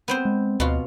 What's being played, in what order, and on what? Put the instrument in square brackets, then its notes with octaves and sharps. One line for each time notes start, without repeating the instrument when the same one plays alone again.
[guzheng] B3 C4 C5
[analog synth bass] G#3
[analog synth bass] D2 [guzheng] B2 F4